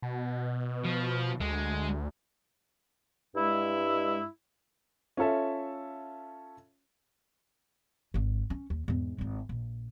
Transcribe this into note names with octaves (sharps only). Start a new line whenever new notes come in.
B2
F3
D2 G#3
G2 G#3 E4
C#4 F4 A4 E5
G#1 D3
C#4
D#2
E2 G#2
G#1 E4
A#1